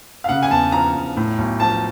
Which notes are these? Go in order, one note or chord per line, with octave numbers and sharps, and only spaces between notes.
F5
C#3 F#5
G#5
E2 A5
F3 A#5
E2
A2
B1
F3 A5